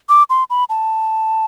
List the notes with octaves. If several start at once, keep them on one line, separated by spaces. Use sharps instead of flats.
D6
C6
B5
A5